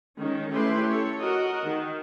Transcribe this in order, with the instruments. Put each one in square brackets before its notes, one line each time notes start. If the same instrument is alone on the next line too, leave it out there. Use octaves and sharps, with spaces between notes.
[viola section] D#3 G#3 C#4
A3 C#4 E4 G4 B4 C6
A4 C#5
F#4 A#4 D#5 F#5
D#3